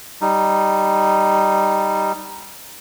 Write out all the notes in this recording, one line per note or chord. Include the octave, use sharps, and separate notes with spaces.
G3 D#4